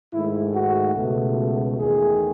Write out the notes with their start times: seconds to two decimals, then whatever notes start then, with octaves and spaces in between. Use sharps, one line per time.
0.13 G#2 D#3 A3 E4
0.55 F#4
0.95 C#2 B2 A3
1.78 E2 D#3 A3 G#4